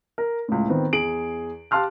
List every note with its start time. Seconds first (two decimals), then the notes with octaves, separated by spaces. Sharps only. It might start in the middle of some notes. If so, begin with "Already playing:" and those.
0.18 A#4
0.48 C#2 A2
0.68 D#3 B3 C4
0.93 E2 G#4 D7 F#7
1.71 G4 F5 A5 C6 F6 F#6